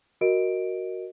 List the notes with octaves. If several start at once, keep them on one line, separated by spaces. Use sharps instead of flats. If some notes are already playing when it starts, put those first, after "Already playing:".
F#4 A#4 D#5 D7